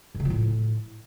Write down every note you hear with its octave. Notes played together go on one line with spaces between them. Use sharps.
F#2
C#3
F3
A2